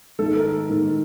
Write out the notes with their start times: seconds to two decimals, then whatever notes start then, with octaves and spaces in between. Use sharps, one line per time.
0.19 G#2 D#3 A4
0.36 A#4
0.70 G#2 D#3